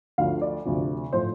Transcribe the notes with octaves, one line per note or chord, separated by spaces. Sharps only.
D2 D3 F3 F5
D5
D2 C3 F3
A2 F3 C5